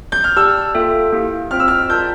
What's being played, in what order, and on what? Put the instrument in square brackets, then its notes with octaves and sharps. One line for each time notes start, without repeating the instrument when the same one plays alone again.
[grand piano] G6
F6
[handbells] G4 D5 A5 [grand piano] E6
[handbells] A#3 F4 A4 E5 G5
A#3 E4 G4
[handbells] C4 F4 C5 G5 [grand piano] F6
[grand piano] E6
F6
[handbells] F4 A#4 D5 A5 [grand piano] G6